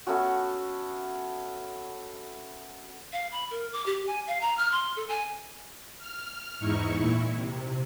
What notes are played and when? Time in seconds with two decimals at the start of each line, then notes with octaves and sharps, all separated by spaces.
0.07 A3 B3 C#4 F#4
3.13 F5
3.32 B5
3.51 A#4
3.73 D6
3.86 G4
4.07 G#5
4.27 F5
4.41 A#5
4.57 F6
4.72 C6
4.96 A4
5.09 G#5
5.98 F6
6.59 E2 G#2 D#4 E4 C#6
6.95 A#2 E4
7.34 C3